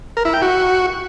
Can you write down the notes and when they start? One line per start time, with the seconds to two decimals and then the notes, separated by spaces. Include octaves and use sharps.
0.17 A#4
0.25 E4
0.34 G5
0.42 F#4